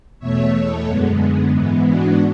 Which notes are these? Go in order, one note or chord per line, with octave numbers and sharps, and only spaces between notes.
E2 B2 A3 C#5 E5
A4 C#5
F#2 D3 G#3 B3
G#2 E3 G#3 B3
D4 F#4